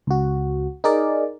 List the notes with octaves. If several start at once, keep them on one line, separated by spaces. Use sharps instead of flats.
C#2 F#4
D#4 G#4 A#4 D5